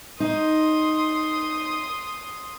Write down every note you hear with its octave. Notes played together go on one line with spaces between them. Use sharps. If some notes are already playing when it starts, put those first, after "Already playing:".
D#4 C6 D#6